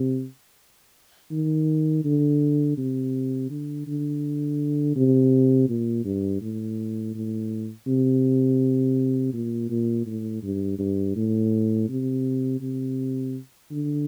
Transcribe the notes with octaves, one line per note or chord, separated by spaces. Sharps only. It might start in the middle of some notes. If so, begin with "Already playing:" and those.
Already playing: C3
D#3
D3
C3
D3
D3
C3
A#2
G2
A2
A2
C3
A#2
A#2
A2
G2
G2
A2
C3
C3
D3